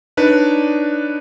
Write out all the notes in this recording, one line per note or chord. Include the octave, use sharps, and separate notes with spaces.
D4 D#4 B4 C#5 D5